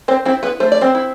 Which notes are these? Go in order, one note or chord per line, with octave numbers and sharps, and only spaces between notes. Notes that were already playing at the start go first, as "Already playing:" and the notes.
C4 C5
C4 E4 C5
B3 B4
A3 C5
D5
C4 C5
E4